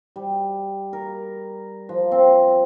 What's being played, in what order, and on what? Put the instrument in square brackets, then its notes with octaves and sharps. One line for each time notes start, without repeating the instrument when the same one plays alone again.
[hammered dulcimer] G3
A#4
F3
C4